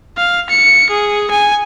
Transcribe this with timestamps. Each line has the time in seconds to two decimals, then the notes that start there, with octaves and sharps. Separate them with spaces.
0.18 F5
0.50 C#7
0.90 G#4
1.31 G#5